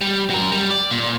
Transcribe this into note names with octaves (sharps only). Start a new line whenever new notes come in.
G3
F#3 A#4
G3
D5
A#2